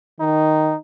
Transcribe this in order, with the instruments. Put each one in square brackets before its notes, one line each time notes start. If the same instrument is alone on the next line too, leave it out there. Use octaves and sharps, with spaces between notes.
[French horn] D#3 [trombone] D#4